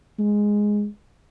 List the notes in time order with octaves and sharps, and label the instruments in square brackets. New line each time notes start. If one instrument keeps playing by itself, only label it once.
[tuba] G#3